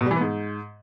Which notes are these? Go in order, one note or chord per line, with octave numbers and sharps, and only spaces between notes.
B2
G3
E3
B3
G#2